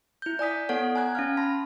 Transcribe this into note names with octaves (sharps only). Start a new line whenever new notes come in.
E4 G6
D5 G#5 D#6 B6
B3 A4 C#5 F#5
G#5 A#5 F#6 G#6
C#4 F5 F6
A5 B5 C6 A#6